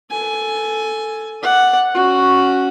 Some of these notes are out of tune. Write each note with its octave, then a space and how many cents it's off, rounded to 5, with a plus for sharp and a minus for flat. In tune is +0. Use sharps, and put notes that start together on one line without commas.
A4 +0 G#5 +15
D5 +0 F#5 +0
C#4 +0 F#4 +0